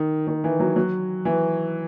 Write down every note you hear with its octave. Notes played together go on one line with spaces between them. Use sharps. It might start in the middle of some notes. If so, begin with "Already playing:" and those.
Already playing: D#3
D#3
E3
F#3
F#3
E3